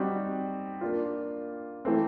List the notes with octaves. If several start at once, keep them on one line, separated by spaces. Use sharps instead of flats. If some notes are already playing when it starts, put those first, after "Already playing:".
Already playing: G3 C4 D#4 F#4
A#3 D4 F4
E3 A3 C4